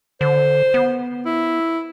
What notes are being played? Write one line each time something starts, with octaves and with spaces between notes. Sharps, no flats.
D3 C5
B3
E4